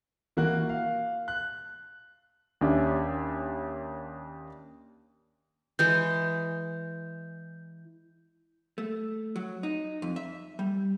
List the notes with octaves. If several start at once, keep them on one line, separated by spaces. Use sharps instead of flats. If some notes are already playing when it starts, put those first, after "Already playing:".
E3 A#3 F#4 F#6
F5
F#6
D#2 C#4 D4 G4 E5
E3 G#3 G6
A3
F#3
D#4
F2
E5
G3